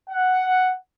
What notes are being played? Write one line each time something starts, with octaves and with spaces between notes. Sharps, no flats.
F#5